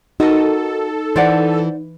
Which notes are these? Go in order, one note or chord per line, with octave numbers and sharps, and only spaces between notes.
D#4 F#4 A4 A#4 D#5
E3 C5 D5 F#5